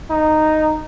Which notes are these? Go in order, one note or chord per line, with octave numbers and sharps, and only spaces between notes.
D#4